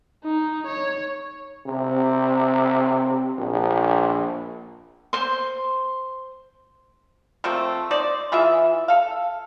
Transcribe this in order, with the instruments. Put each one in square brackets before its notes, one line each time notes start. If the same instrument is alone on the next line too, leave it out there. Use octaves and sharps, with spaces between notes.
[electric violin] D#4
C#5
[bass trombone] C3
A#1
[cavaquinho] C5 C6
[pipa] F3 A3 A#3 C4
D#4 C5 D5
E3 F4 G#4 E5
A4 F5